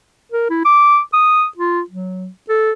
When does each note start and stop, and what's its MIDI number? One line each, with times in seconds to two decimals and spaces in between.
0.32 0.45 70
0.50 0.62 64
0.65 0.99 86
1.13 1.45 87
1.57 1.81 65
1.90 2.28 54
2.49 2.72 69